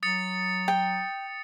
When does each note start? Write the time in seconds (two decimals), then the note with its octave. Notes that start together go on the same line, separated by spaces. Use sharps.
0.03 F#3 D#6 A6 C#7
0.68 G5